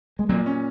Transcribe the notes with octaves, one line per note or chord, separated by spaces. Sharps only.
G#3
A#2 F#3 A#3
C#4